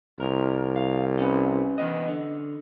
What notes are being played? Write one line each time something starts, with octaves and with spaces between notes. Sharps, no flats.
C2 A#4
F5
C#4 B4
E3 B3 D#5
D3